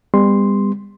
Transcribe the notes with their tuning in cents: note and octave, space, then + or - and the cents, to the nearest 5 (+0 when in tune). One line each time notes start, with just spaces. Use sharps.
G3 +35 B3 +25 C6 +0